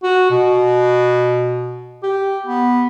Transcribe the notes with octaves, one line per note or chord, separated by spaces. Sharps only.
F#4
B2
G4
B3